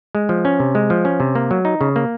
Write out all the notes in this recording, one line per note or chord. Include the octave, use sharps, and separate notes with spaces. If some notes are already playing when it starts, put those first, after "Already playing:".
G#3
F3
C#4
C3
G#3
F3
C#4
C3
A#3
F#3
D#4
C#3
A#3